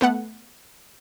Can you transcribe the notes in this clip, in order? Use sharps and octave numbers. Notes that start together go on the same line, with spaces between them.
A3 B3 F#5